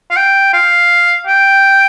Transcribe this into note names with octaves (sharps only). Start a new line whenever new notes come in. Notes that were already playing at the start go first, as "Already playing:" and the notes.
F5
G5
F5
G5